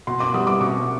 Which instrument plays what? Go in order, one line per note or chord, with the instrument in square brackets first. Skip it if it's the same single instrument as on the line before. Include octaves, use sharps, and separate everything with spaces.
[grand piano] B2 [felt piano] C6
[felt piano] D6
[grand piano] G3 B3 [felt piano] D#6
[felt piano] D6
[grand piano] B2 [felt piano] C#6